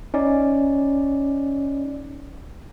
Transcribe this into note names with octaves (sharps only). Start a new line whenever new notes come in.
C#4 D#4 D5